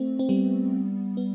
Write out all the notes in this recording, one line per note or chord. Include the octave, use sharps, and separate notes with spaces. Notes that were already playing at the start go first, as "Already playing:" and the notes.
Already playing: A3 C4
C4
G3 B3
B3